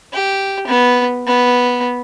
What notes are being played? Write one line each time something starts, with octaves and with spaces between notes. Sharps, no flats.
G4
B3
B3